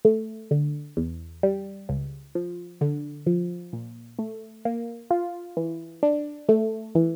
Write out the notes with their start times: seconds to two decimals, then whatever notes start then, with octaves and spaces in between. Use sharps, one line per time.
0.05 A3
0.51 D3
0.97 E2
1.43 G3
1.89 C#2
2.35 F3
2.81 D3
3.27 F3
3.73 A#2
4.19 A3
4.65 A#3
5.11 F4
5.57 E3
6.03 D4
6.49 A3
6.95 E3